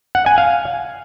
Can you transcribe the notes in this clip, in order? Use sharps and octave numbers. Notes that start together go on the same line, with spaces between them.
F#5
G#5
F5